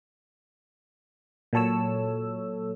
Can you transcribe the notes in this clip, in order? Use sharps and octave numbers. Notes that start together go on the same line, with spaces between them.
A#2 F#3 A4 C#5 E6